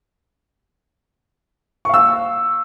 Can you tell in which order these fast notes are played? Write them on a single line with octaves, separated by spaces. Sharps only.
C#6 F5 E6